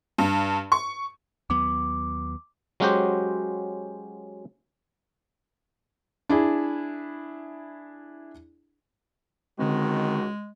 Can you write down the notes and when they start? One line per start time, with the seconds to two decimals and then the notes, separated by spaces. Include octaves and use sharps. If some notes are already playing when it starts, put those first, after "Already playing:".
0.18 G2
0.72 C#6
1.50 D#2 F#3 B3 D6
2.80 F#3 G#3 C#4 F#4 G4 C5
6.29 D4 E4 G#4
9.59 C#2 D3 D#3 G#3 C4 F#4